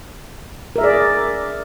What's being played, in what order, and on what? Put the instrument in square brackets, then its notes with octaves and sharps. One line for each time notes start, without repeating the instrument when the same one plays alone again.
[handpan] A#4
E5
G#4
D5